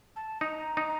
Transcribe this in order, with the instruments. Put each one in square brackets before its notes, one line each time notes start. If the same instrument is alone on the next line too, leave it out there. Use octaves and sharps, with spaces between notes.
[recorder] A5
[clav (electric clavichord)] D#4 [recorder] A#5
[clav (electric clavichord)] D#4